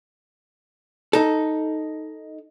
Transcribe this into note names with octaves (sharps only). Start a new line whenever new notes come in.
D#4 A4